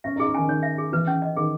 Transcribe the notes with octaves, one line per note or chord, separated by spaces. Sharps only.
C#4 E5
D#4 G#4
C#4
D#3 G#5
D#3 C#5
E5
G#4
E3 B4
C#4
D#5
D#3 G#4